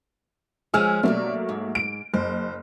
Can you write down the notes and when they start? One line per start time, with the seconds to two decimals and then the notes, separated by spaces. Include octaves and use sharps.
0.74 F3 G#3 C#4 G#5 E6 F6
1.03 G2 B2 F#3 A3 A#3 D5
1.49 G#2
1.75 D7
2.14 F#1 C5